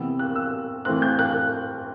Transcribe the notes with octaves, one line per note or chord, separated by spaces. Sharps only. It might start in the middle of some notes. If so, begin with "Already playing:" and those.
Already playing: C3 E3 B3 E6
F#6
E6
E3 A3 C4 F#6
G6
F#6